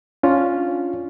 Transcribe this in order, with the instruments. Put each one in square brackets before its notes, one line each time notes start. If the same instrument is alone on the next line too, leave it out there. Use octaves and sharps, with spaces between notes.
[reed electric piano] C#4 D4 F4